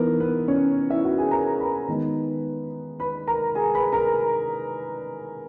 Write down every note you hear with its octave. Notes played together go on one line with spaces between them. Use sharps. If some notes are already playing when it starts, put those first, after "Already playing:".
Already playing: E3 B3 D#4 A#4
B3 B4
C#4 C#5
E4 E5
F#4 F#5
G#4 G#5
A#4 A#5
B4 B5
D#3 G#3 B3 D#4
B4 B5
A#4 A#5
G#4 G#5
B4 B5
A#4 A#5